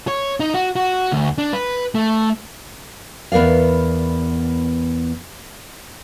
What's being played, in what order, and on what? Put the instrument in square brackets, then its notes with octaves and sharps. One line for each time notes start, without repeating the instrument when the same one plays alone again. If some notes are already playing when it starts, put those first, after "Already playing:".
[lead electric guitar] C#5
D#4
F#4
F#4
D2
D4
B4
A3
[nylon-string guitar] E2 B3 A#4 D5 F5